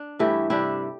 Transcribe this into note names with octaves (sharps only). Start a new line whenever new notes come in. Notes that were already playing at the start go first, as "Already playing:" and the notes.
Already playing: D4
G2 E3 A3 E4 G4
C3 G3 D4 E4 G4